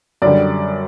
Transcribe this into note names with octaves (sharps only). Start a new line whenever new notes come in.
F#2 D3 G3 D5